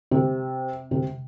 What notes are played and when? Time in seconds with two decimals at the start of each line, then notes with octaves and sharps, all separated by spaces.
0.11 C3
0.91 C3